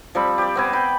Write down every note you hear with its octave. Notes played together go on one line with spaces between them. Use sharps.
F3 G3 C4 B5
G4 D5
B3 C4 G#5
G5 B5